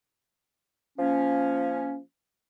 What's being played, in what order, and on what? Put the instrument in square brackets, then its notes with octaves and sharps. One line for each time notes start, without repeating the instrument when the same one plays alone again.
[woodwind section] F3 A#3 C#4